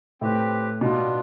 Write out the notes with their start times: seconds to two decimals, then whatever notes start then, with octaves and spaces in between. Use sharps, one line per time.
0.21 A2 C4 G4 B4
0.81 B2 G3 B3 D4 F4